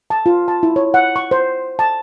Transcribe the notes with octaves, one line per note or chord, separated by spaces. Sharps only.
A5
F4
A5
E4
C#5
F#5
C#6
C5
A5